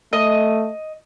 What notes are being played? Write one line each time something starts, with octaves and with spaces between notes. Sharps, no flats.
A3 D#5